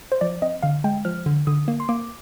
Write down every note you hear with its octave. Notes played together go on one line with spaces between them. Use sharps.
C5
F3 D5
C4 D#5
D3 F5
G#3 G5
F3 F6
D3
D3 D#6
A#3
C6
A#3 D6